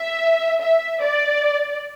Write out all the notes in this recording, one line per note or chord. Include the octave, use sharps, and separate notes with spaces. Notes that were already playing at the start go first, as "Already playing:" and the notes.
Already playing: E5
E5
D5